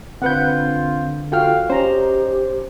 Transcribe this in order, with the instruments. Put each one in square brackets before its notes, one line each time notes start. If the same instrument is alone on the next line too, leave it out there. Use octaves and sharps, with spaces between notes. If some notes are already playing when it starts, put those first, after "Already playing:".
[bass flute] D3 [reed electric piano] C4 G6 [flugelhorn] F4 [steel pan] B4 F#5
[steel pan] F4 F#4 [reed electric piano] A4 G5 F6 [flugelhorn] F5
[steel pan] C#4 A#5 [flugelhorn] D#4 [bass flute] G4 [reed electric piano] C5